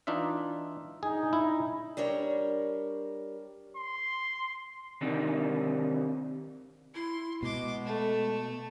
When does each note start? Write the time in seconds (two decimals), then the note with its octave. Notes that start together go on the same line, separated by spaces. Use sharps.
0.07 E3 D4 D#4 F4 E5
1.03 D4 D#4 G#4
1.33 E4
1.97 G3 D4 A#4 C#5
3.76 C6
5.01 C3 D#3 D4 D#4
6.94 E4 C6
7.43 B2 G#3 C6 D6
7.85 A3 A4